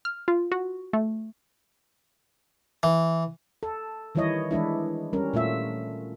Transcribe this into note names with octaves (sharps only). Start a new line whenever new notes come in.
F6
F4
F#4
A3
E3
A4
D#3 E3 G3 E4 C#5 D#5
E3 G#3 D4 E4
G3 C#4 A#4
A#2 A3 F4 E5